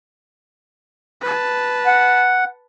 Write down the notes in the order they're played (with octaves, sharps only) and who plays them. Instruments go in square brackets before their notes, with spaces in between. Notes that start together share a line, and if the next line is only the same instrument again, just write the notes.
[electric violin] B4 A5
[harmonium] F#5